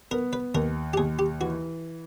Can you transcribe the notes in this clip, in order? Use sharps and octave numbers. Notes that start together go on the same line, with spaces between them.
B3 A#4
B4
D#2 A#4
G4
D#2 G#4
G4
E3 F#4